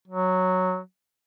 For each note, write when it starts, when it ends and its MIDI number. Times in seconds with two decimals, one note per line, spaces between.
0.08 0.79 54